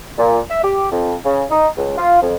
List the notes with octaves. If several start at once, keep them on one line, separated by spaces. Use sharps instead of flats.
A#2
E5
G4
F2
C#3
D#4
C#2
F4
F2